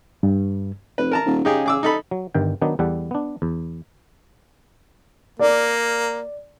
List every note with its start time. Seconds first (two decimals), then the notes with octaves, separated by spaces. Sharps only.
0.23 G2
0.98 F1 B4
1.11 A#4 A5 A#5
1.26 D#1
1.45 C#3 D#4 G4 G#4
1.66 G#4 D6 E6
1.83 D#4 A4 B5
2.11 F#3
2.34 G1 G2 D#3 G5
2.62 D#3 F#3 B3 D4 D#4
2.79 E2 G3 A4 F#5
3.11 B3 D4
3.42 E2
5.39 A#3 D5